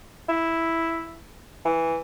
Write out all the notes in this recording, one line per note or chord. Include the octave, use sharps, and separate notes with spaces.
E4
E3